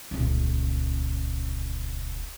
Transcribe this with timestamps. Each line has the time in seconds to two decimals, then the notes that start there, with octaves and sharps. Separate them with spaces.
0.11 D#1 C#2